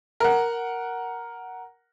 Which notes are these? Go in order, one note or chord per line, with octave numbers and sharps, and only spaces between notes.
A#4 F#5